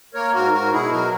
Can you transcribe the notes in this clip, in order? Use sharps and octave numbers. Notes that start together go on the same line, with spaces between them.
A#3 A#4 C#5
G#2 F#4 A#4
G#2 F#4 A#4
B2 E4 G#4
F#3 F#4 A#4